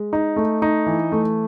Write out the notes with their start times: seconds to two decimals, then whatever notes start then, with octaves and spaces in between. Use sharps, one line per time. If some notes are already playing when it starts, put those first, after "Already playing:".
Already playing: G#3
0.13 D#4
0.36 A3
0.62 D#4
0.86 E3
1.12 A3